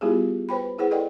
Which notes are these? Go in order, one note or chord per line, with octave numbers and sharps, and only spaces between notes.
G3 B3 E4 F4 G4 G#4
B4 C5 G5 B5
E4 G#4 B4 C5 F#5
E4 A4 D5 D#5 F#5 G5